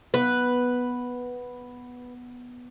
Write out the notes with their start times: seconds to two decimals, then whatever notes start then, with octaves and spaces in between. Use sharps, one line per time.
0.14 B3 B4